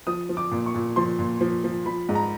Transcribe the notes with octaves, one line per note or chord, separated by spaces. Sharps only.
F3 D#6
F3
D6
A#2
C#6
A#2
F3 C6
A#2
F3
F3
F3 B5
G#2
A#5